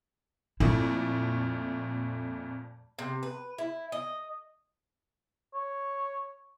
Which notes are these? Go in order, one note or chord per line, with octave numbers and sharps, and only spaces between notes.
F2 A#2 A3 E4
C3
B4
E4
D#5
C#5